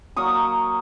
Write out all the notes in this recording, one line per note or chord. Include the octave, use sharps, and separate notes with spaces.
F#3 A#3 C#6 D#6